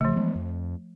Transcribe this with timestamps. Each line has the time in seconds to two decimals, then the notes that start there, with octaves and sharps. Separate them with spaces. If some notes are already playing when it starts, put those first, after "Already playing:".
0.01 A1 C#3 F3 A3
0.15 E3 G#3 B3
0.35 F2